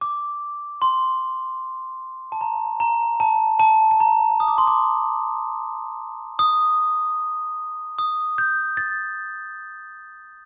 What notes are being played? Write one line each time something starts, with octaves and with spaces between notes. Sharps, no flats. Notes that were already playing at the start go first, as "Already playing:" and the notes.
D6
C6
A5
A#5
A#5
A5
A5
A5
A#5
D#6
D6
C6
D6
D#6
D#6
G6
A6